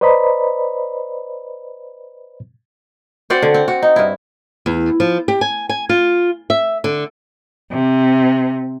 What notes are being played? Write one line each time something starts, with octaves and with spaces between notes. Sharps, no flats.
B4 C5 D5 D#5 A#5 B5
C4 F#4 C5 D5
D3
C4
F#4
D#4
G2 E4
E2
F3
G4
G#5
G#5
F4
E5
D3
C3